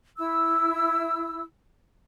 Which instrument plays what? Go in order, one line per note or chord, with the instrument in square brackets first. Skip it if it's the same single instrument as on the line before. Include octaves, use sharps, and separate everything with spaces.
[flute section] E4 E6